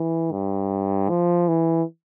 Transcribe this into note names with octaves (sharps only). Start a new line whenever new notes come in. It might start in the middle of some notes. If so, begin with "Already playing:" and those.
Already playing: E3
G2
F3
E3